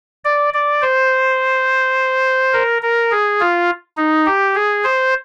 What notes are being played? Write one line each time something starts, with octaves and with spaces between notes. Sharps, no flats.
D5
D5
C5
A#4
A#4
G#4
F4
D#4
G4
G#4
C5